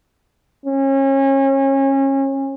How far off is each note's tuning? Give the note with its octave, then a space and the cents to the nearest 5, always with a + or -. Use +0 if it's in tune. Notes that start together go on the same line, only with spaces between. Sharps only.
C#4 -30